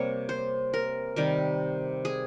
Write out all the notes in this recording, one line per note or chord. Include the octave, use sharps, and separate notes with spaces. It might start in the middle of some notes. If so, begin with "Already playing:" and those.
Already playing: C3 G3 A#3 C#5
C5
A#4
C3 D#3 G3
G#4